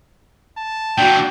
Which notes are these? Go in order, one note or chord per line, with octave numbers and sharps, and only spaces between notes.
A5
A#2 E3 D4 F#4 G5